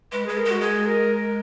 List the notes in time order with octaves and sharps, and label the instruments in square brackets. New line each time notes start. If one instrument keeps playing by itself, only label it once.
[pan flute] G#3 [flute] B4
[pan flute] G#3 [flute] G#4
[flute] A#4
[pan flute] G#3
[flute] F#4
[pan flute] G#3 [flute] G#4
[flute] A#4